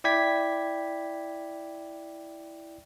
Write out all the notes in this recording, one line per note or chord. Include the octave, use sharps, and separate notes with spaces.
E4 D5 G5 G#6 B6